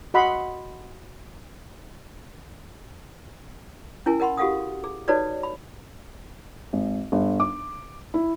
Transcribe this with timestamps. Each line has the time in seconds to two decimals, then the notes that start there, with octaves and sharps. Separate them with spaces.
0.14 F#4 D#5 F#5 B5 C6
4.06 C#4 E4 A#4 G#5
4.20 A#4 D#5 F#5 B5 C6
4.37 F#4 G4 A4 F5 F#5 D#6
4.84 G#4
5.08 D#4 F#4 A4 B4 C#5 D5
5.43 B5
6.73 G#1
7.12 G1
7.40 D6
8.14 E4